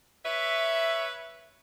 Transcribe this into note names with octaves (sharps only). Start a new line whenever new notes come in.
B4 C#5 E5